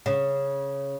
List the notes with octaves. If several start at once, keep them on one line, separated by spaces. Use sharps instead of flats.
C#3